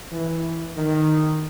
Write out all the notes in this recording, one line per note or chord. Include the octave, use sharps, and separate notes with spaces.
E3
D#3